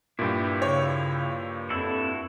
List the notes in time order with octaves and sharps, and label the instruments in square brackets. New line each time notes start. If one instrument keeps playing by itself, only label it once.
[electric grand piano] G2 A#2 [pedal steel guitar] E4 G4
[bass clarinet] C#3 [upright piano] C#5
[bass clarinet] F2 [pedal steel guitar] E4 F#4 A4